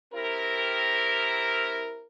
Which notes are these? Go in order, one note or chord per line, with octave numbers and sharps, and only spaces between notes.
C4 E4 G4 A#4